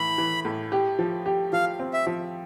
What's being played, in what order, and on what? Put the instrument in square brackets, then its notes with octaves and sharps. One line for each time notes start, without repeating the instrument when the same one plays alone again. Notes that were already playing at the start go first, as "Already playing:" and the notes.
Already playing: [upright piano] A2 E3 [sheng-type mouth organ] B5
[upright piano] E3
A2
G4
F3
G4
[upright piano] F3 [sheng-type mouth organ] F5
[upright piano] C4
[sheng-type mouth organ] E5
[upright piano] F3